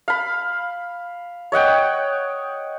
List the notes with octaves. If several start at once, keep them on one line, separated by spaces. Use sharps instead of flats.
F5 B5
C#5 D#5 F#5 G5